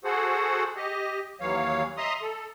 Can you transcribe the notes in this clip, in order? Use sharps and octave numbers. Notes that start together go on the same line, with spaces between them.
F#4 G#4 A4 C5 F#5
G4 D#5
D#2 E3 F#3 C#5 F5
D#5 E5 A#5 C6 D#6
A4